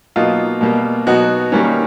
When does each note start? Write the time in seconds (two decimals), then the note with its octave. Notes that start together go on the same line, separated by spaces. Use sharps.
0.16 B2 F#3 A#3 D#4 F4
0.61 B2 G3 A#3
1.07 B2 F#3 B3 D#4 F#4
1.52 D#3 G3 A#3 C#4